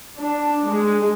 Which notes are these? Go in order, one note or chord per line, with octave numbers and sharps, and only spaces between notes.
D4
G#3